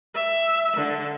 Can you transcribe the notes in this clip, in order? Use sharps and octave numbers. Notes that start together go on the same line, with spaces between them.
E5
D3